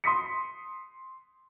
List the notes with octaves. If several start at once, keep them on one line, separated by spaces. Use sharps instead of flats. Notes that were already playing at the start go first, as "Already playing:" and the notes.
C6 D#6 B6 C#7